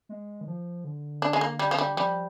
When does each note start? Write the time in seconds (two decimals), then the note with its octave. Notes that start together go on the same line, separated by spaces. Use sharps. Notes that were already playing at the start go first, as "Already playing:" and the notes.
0.09 G#3
0.41 D#3
0.48 F3
0.84 D3
1.22 D4
1.33 G#3
1.41 A#3
1.59 G3
1.71 F3
1.78 G3
1.97 F3 G3